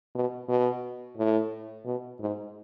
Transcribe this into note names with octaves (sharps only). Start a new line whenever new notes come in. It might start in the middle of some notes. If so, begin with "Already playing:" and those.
B2
B2
A2
B2
G#2